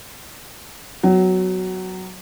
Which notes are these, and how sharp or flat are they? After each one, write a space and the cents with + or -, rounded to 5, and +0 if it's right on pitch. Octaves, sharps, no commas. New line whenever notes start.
F#3 +5 B3 +30 F#5 +30